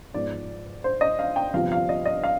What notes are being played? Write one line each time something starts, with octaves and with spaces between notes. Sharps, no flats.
G#2 F3 B3 D5
C5
D#5
F5
G5
G1 F2 C3 F3 F5
F5
D#5
D#5
F5